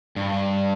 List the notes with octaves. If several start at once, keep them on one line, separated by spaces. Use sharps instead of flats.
G2